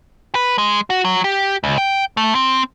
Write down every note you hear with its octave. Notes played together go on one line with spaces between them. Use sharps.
B4
G#3
F#4
F#3
G4
C#2
G5
A3
C4